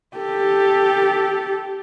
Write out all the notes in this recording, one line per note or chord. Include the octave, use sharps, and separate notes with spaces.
G4 A4